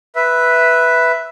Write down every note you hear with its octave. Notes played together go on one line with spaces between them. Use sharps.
B4 E5